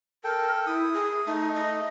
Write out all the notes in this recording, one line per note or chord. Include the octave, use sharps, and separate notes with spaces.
A4 A#4 G5
E4 D#6
G#4
A3 D#4
D#5